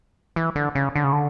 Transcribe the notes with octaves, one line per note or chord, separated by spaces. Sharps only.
E3
D3
C#3
D3
C#3
D3